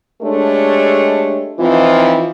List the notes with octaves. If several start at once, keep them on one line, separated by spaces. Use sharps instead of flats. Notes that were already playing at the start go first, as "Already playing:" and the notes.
G#3 A3 D4 G4 A4 C#5
E3 F3 C4 D#4 F4